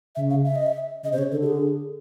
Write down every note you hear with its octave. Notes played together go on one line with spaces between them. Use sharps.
C#3 E5
F5
E5
D#5
E5
C#3 D#5
C3 C5
C#3 C#5
D3 A4
G4
G#4